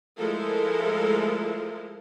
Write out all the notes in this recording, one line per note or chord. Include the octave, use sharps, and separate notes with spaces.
F3 G#3 A3 E4 A4 A#4